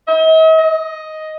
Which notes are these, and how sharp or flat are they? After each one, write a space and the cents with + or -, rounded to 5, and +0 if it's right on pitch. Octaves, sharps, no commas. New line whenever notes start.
D#5 +45
D#5 +10